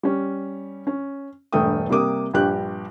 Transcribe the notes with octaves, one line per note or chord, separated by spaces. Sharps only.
G3 C#4
C#4
E1 G2 A3 G5 D#6
C3 G3 A#3 D6 D#6
A#1 G2 G4 F#6